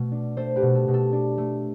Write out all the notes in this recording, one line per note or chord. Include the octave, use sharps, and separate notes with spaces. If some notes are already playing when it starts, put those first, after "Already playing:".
Already playing: B2 A3
D4
A3 A4 C5
G4 B4
B2
A4
B2
A4
D4
A3